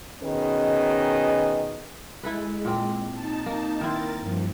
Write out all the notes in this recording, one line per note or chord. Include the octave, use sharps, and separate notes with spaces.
B2 D#3 C#4 G#4 B4 D#5
G#3 E4 A4 B4
A#2 C4
D#4 A5
A#3
D#3 E4 A#4 C5 A6
G2 F3